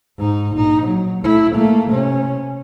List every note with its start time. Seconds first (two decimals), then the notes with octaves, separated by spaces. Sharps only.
0.18 G#2 D#4
0.56 A#1 D#4
0.87 F#3
1.23 A3 E4
1.55 A3 A#3
1.91 C3 C#4